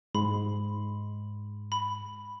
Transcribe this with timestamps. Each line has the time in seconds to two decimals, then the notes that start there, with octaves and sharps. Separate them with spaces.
0.15 G#2 G#3 B5 C6
1.72 B5